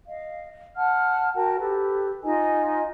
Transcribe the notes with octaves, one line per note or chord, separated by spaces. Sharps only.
D#5 F5
F#5 A5 F6
F#4 A#4 G5 A5
G4 A4 B4
D#4 F4 D#5 G#5